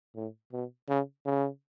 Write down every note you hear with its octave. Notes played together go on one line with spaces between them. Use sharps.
A2
B2
C#3
C#3